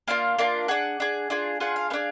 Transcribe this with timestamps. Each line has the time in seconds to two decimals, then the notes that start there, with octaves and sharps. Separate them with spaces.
0.08 A#3 D4 F4 F5
0.38 A#3 D4 F4
0.68 D4 G#4 F#5
1.00 D4 G#4
1.30 D4 F4 G#4
1.60 D4 F4 G#4 F#5
1.76 F5
1.90 B3 F5
1.94 D4 G#4